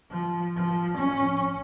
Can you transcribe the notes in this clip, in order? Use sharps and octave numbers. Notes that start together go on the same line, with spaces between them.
F3
F3
C#4